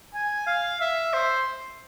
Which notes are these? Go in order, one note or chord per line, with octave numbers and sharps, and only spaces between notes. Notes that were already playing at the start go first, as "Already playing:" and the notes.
G#5
F5
E5
C5